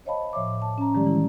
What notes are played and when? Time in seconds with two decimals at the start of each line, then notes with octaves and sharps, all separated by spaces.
0.05 C5 C#5 D#5 F5 A5 B5
0.33 A2 F3 C#5 E5 D6
0.62 A5
0.78 C#4 A#5
0.94 D#3 F3 G3 G#3 G4 D5
1.06 E3 G#3 E4